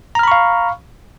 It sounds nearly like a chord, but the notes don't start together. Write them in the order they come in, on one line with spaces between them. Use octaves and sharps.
A#5 F6 B5 C#6 F5